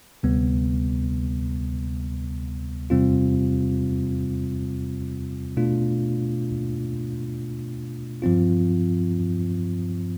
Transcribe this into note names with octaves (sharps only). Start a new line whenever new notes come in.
D2 C3 G3 B3
E2 C3 G3 C4 F4
B2 A3 D4 F4
G2 F3 C4 F4